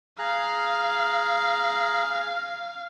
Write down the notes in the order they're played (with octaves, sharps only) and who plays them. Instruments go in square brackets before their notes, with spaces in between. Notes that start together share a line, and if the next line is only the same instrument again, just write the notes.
[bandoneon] G#4 A#5 F#6 [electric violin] F5